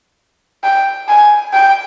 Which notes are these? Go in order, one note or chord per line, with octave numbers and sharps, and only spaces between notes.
G5
G#5
G5